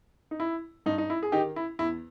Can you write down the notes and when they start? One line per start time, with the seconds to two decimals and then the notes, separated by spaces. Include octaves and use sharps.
0.31 D#4
0.40 E4
0.86 G2 D#4
0.98 D#4
1.10 E4
1.23 G#4
1.32 D#3 D#4 G4
1.56 E4
1.79 E2 E4